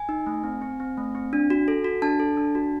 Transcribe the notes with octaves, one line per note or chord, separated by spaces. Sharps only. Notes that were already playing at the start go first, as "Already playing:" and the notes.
Already playing: G#5
D#4
A3
C4
C4
C4
A3
C4
D4
F#4
A4
F#4
D4 A5
A4
D4
F#4